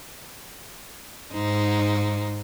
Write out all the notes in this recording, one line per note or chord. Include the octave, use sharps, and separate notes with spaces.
G#2 D#4 C5